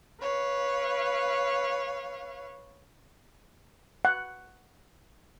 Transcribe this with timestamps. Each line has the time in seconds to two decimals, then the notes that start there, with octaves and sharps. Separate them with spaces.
0.20 B4 C#5 F5
4.05 F#5